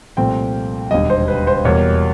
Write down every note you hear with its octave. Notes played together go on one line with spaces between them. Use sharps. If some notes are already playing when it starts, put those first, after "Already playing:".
C2 A#2 F3 A3 C4 G5
E1 D#2 D3 G3 D#5
C5
B4
C5
E2 B2 G3 A#3 C#5